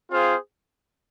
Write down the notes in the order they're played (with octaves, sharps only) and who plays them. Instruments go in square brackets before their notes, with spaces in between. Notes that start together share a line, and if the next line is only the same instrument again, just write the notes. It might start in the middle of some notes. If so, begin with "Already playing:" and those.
[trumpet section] C4 F4 G#4 C5 F5